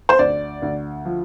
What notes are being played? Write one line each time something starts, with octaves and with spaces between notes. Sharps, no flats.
C5
D2 D5
D2
F3